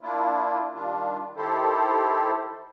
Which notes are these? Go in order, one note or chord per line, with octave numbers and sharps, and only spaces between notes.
A#3 D4 E4 F4
D#3 G3 D4 F4
D#3 E4 G4 A4 C5